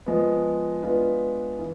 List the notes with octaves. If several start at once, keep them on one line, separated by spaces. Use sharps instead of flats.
F3 G#3 B3
G#3 B3 D4 F4 B4
E3